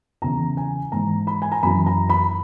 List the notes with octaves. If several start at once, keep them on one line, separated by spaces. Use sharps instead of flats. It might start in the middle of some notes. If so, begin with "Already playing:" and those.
E2 C#3 E3 A#5
G#5
G#2 E3 A#5
B5
G#5
A#5
F#2 E3 B5
A#5
B5